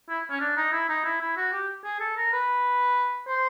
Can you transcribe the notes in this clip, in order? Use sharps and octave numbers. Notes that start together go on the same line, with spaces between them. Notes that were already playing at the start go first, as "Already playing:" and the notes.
E4
C#4
D4
D#4
E4
D#4
E4
E4
F#4
G4
G#4
A4
A#4
B4
C5